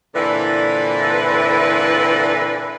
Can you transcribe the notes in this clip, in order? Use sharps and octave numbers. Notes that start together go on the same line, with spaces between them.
A#2 D3 E3 C4 E4 B4